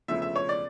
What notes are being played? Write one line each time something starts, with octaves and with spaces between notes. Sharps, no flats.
E1 D2 C#3 F3 E5
E5
C#5
D5